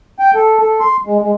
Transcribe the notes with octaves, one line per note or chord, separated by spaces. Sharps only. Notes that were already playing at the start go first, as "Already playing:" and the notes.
G5
A4
A4
C6
G#3
G#3